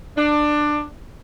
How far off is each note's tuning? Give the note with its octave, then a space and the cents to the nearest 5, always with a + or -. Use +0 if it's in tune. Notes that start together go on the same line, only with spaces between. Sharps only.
D4 +15